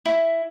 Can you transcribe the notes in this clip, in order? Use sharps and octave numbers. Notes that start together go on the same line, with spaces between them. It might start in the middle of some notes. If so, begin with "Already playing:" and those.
E4